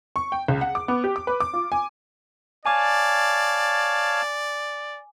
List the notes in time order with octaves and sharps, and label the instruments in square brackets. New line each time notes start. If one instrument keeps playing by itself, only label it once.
[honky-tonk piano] C#6
G5
C#2
F#5
D6
B3
G4
D6
B4
D6
F4
G#5
[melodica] C#5 F5 A5 [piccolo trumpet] D5 [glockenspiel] G#5 D6